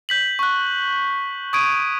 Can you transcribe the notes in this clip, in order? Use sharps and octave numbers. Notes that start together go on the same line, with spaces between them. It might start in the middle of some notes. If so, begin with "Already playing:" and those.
G6 B6 F#7
C#6 F#6
C#6 D#6 G#6 D7 D#7